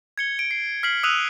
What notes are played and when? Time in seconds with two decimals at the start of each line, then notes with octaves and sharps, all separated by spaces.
0.18 G#6 C#7 G7
0.39 D7
0.51 C7
0.83 F6 B6 C7 F#7
1.03 D#6 E6 F#6 D#7 F7 F#7